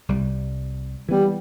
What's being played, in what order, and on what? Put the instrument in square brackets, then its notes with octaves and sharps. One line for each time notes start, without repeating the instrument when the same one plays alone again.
[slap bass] C2 G3
[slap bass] E3 B3 [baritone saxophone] G3